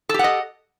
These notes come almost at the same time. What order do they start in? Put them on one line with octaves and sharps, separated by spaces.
A4 G4 F#5 D#5